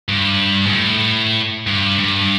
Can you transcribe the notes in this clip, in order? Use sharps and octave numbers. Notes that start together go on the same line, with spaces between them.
G2
G#2
A2
G2
G2